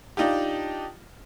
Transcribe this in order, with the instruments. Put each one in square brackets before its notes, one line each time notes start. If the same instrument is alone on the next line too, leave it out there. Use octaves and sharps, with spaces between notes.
[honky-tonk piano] D4 D#4 F4 G4